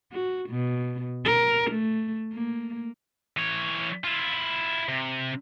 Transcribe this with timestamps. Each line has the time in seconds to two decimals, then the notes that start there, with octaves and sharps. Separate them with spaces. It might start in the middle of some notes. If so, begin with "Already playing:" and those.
0.12 F#4
0.49 B2
1.25 A#4
1.71 A3
2.33 A#3
3.37 E3 C#5
4.04 E4 F4
4.89 C3